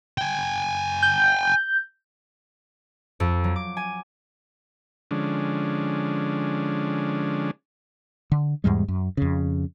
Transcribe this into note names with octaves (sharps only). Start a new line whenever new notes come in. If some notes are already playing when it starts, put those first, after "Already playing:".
G5 G#5
G6
F2
F#3
D6
G#5
D3 F3 G#3 C#4 D4
D3
E2 G#2 G3 G#3
F#2
F2 C#3